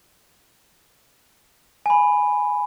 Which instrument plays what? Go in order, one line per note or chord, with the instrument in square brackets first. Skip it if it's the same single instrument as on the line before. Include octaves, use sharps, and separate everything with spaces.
[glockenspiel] G#5 B5